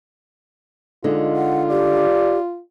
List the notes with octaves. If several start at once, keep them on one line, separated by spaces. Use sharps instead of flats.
D3 G#3 D#4 F4
F#5
G4 D5